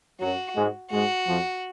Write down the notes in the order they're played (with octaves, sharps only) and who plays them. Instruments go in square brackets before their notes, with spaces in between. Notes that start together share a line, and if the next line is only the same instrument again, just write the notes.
[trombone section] F#2 F#3 [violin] F#4
[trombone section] G#2 G#3
[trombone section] G#2 G#3 [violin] F#4
[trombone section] F2 F3